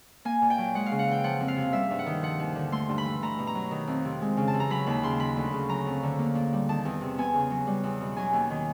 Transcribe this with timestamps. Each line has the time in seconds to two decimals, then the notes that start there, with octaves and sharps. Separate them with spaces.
0.25 A#3 G#5
0.42 A#2
0.50 G5
0.58 F#3
0.75 G#3 F#5
0.86 F5
0.92 C#3
0.99 F#5
1.07 E3 G5
1.24 F3 F#5
1.40 F2
1.48 F5
1.56 C3
1.73 G3 E5
1.90 G2
1.99 F#5
2.06 D#3
2.22 F3 F#5
2.40 D#2
2.55 D3
2.72 A3 C6
2.89 G2
2.98 B5
3.05 E3
3.22 A3 A#5
3.38 B2
3.47 A#5
3.55 F#3
3.71 D#3
3.87 F2
4.05 C3
4.22 G#3
4.37 C#3
4.48 A5
4.54 E3
4.60 A#5
4.70 F#3 B5
4.87 D#2 B5
5.03 C#3 C6
5.19 F#3 B5
5.36 D2
5.53 C#3
5.69 F#3 A#5
5.86 F2
6.03 D3
6.19 A#3
6.35 A#2
6.53 G3
6.69 D#3 A5
6.85 E2
7.01 C3
7.18 B3 G#5
7.34 C#3
7.50 F#3
7.67 G3
7.83 E2
8.01 B2
8.16 F#3 G#5
8.33 D#2
8.50 D#3